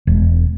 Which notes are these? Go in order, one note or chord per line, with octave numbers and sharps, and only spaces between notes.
E1